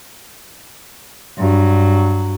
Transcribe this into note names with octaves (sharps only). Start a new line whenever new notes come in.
G2 F#3